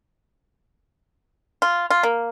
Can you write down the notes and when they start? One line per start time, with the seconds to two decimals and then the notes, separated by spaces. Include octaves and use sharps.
1.62 F4
1.90 F4
2.03 A#3